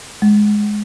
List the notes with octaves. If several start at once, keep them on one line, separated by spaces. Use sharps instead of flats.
G#3